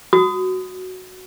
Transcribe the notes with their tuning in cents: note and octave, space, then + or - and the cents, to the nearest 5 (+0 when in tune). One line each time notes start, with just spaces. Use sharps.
F#4 +0 D#6 +0